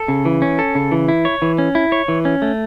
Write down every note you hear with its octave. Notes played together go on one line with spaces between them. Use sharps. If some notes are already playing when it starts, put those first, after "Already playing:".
Already playing: A4
C#3
E3
C#4
A4
C#3
E3
E4
C#5
E3
C#4
E4
C#5
E3
C#4
A3